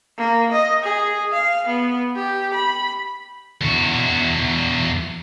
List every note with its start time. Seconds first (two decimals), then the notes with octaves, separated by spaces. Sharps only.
0.18 A#3
0.52 D#5
0.83 G#4
1.32 F5
1.68 B3
2.16 G4
2.54 B5
3.61 E2 F#4